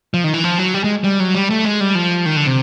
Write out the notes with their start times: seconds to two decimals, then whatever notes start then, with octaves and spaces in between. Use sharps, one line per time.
0.14 F3
0.24 D#3
0.34 E3
0.44 F3
0.59 F#3
0.74 G3
0.84 G#3
1.04 G3
1.20 F#3
1.35 G3
1.50 A3
1.65 G#3
1.80 G3
1.95 F3
2.26 D#3
2.36 D3
2.46 C3